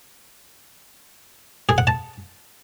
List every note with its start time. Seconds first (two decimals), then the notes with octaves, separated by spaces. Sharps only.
1.69 G#4
1.78 F#5
1.87 A5